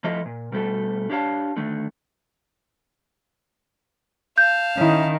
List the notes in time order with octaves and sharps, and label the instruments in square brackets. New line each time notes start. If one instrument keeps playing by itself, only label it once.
[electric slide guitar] F3 A3 E4 F4 D#5
A#2
B2 G3 A3 A4
D4 G4 C#5 F5 A5
D3 D#3 A3
[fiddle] F5 A5 [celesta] G6
[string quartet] D#3 [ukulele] C#4 E4